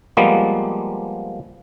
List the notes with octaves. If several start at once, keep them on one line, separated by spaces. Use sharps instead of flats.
F3 G3 G#3 A#3 B3